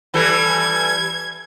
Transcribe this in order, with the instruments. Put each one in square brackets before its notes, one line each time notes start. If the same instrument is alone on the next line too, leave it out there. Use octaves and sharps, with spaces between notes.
[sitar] E3 G3 A4 [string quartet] G#6